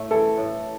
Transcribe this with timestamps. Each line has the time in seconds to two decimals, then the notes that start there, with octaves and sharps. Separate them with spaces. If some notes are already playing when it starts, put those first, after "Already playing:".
Already playing: A2 A3
0.11 E3 A4
0.37 A2